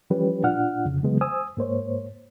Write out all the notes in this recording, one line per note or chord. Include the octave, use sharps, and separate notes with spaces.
E3 F3 G3 C#4 G4 B4
A#2 D4 F4 F#5 F6
F2 C#3
C#3 E3 F#3 G#3 B3
C5 G#5 D#6 E6
G#2 A#3 C5 C#5